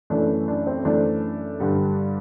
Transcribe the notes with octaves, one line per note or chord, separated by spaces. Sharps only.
F#2 E3 A3 D4
D4
C4
F#2 E3 A3 D4
G2 D3 G3